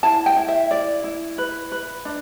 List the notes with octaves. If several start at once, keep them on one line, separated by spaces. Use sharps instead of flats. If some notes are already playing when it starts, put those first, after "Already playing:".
E4 A5
G5
E4
E5
E4 D5
E4
B4
B4
D4